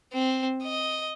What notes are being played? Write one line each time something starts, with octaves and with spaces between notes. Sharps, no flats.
C4
D#5